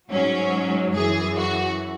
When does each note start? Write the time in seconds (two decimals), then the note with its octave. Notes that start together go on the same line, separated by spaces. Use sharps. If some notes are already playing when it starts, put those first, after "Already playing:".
0.11 G#2 F#3 C#4
0.95 F#2 E3 G#4
1.37 F#4